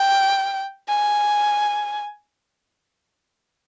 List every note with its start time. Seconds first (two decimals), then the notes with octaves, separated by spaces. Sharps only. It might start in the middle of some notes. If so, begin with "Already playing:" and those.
Already playing: G5
0.89 G#5